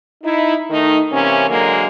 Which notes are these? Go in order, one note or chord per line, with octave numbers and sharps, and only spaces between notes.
D#4 E4
D#3 A3 D#4
C3 E3 A#3 C#4
D3 F#3 G#3 A#3